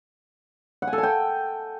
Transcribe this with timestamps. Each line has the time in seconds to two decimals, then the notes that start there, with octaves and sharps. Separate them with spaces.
0.82 F#5
0.87 G#5
0.93 A4
0.98 G#5
1.03 G5